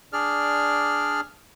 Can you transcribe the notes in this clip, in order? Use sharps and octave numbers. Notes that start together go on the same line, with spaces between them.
D4 G#4 D5 F6